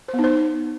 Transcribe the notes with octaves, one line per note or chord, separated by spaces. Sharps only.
C5
B3
D#4
C5